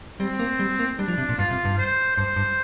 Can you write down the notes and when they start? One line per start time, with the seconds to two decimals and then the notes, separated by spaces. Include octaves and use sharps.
0.20 G3 C4
0.39 A#3
0.60 G3
0.79 A#3
0.99 G3 D4
1.08 F3
1.18 C3
1.29 A#2
1.38 G2 F4
1.51 C3
1.65 G2
1.78 C5
2.17 G2 C5
2.36 G2